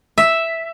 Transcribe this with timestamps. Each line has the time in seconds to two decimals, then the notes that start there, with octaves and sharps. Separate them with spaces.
0.18 E5